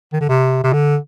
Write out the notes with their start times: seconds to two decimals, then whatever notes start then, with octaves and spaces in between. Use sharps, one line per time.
0.13 D#3
0.21 D3
0.29 C3
0.64 C3
0.73 D3